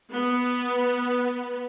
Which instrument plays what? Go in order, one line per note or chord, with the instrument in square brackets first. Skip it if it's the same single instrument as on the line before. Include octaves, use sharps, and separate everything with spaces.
[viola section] B3